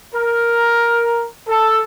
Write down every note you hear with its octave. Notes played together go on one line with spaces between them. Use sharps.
A#4
A4